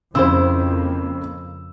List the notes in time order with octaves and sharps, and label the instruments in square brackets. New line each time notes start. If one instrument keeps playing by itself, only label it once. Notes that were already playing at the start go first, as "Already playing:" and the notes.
[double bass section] F2 A#3 [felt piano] C#3 E6 [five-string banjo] C4 E4 C5